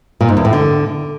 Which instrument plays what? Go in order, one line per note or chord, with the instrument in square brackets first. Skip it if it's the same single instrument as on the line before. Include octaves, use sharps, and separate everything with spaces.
[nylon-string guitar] A#2
G#2
E2
A2
D3